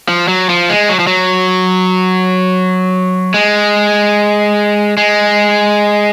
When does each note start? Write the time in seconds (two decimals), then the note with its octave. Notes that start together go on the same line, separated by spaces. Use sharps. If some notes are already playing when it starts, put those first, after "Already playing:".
0.08 F3
0.28 F#3
0.49 F3
0.69 G#3
0.89 F#3
0.99 F3
1.07 F#3
3.34 G#3
4.97 G#3